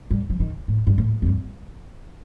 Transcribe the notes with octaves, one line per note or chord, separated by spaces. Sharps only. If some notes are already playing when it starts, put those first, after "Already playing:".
G3
F3
D#3
A2
G2
A2
F2
G2